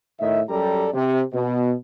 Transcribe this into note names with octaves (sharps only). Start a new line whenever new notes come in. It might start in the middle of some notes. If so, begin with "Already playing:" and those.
A2 D#3 D#5 E5
F#2 G3 G4 A4 D5 A#5
C3
B2